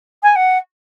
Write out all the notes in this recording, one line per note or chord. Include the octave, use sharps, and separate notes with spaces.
G#5
F#5